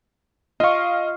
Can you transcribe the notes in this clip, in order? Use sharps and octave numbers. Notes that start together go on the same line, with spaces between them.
F4 D#5 F5 C#6